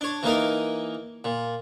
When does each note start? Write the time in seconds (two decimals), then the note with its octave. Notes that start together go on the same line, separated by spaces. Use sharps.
0.01 D4 C#5
0.23 E3 A#3 D#4 A#4
1.24 A#2